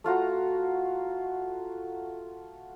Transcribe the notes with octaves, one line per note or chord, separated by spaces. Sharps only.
A3 F4 F#4 A#5